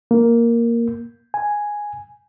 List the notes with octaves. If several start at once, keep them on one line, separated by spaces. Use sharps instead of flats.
A#3
G#5